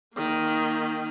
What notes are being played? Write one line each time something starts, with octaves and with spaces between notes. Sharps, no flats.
D#3 A#3